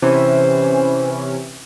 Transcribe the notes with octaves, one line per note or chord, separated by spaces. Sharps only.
C3 E3 C#4 C5